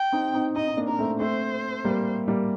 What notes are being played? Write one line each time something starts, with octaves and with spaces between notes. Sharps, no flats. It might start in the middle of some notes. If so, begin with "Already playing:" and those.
Already playing: G5
C4 D#4
C4 D#4
C4 D#4 D#5
D#4
A#3 D4
D4 A#4
A3 C4
A3 C4 C5
G3 A#3
G3 A#3